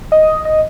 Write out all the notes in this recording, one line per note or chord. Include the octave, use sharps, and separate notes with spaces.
D#5
D#5